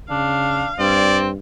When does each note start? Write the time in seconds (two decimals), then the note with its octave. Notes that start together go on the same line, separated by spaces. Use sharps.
0.10 C#3 D4 F5
0.79 G2 C4 D5